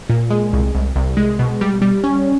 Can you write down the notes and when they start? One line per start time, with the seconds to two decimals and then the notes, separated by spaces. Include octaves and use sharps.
0.10 A#2
0.30 G#3
0.53 C2
0.75 C2
0.96 C2
1.17 G#3
1.39 B2
1.61 G3
1.82 G3
2.04 C#4